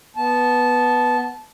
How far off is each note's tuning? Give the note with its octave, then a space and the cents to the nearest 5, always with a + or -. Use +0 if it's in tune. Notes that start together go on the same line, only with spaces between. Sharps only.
B3 +0 A5 -15